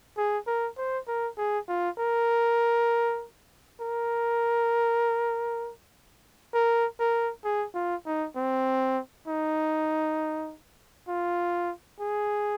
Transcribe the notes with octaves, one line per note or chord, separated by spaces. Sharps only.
G#4
A#4
C5
A#4
G#4
F4
A#4
A#4
A#4
A#4
G#4
F4
D#4
C4
D#4
F4
G#4